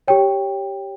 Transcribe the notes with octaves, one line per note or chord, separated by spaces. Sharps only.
G4 C#5 G5